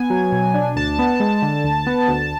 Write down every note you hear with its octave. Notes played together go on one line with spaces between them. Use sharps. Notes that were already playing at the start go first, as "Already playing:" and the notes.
Already playing: B3 G#5
F#3
B2
D4
D2 A5
B3
G#3
D3
D2
B3
D2